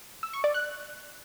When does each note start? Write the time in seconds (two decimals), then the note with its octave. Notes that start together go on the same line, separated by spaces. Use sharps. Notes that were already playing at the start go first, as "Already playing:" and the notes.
0.23 E6
0.33 C#6
0.44 D5
0.54 F#6